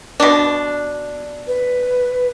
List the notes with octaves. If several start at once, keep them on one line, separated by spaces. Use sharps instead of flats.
B2 D4
B4